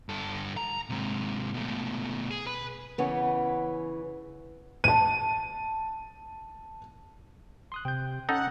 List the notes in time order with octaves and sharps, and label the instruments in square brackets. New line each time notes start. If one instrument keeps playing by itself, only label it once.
[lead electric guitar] G2 A4
A#5
G#2 C3
B2 A3
G#4
B4
[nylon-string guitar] C#3 E3 B3 C#4
[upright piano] A5 D#7
[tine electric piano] C6 D#6 F#6
[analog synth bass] C3 [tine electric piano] G5 G6
[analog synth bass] C#4 [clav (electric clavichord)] D#4 A4 [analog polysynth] F#5